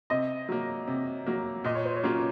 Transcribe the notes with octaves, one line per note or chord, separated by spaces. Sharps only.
C3 D#5
F#3 A#3
C3
F#3 A#3
A#2 D#5
C#5
C5
C#5
F#3 A#3 C#4 F4